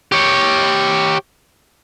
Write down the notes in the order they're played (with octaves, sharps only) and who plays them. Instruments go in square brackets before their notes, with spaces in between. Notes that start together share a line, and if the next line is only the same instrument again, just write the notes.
[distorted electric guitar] G4 C#5